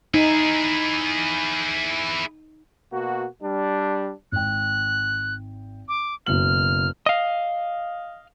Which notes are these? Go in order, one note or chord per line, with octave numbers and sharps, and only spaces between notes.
D#4 E4 G#4
B2 A#3 F#4
G3 D4
G#1 G5 F#6
D6
F#1 B2 F6 F#7
D#5 F5